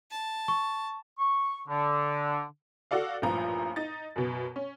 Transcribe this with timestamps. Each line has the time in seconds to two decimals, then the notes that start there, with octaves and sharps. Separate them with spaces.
0.11 A5
0.48 C#6
1.18 C#6
1.68 D3
2.91 F#4 A4 D5 F5
3.22 A1 G2 A#2 F3 A#5
3.76 D#4 A6
4.16 F#2 B2
4.56 C#4